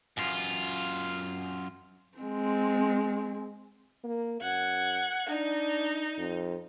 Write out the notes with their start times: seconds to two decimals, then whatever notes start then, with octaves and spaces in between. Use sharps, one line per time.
0.17 F#2 F4
2.18 G#3 C4
4.04 A#3
4.41 F#2 F#5 G#6
5.29 D4 D#4
6.18 F2